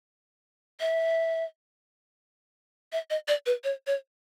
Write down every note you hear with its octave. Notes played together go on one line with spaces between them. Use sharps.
E5
E5
D#5
D5
B4
C#5
C#5